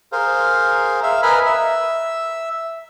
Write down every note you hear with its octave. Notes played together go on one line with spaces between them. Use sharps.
G#4 A#4 C5 F5
E5 F5
A#4 B4 D#5 G#5 A#5 B5
E5